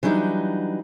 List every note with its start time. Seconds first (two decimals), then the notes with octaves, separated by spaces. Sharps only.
0.03 E3 F#3 G3 D4 D#4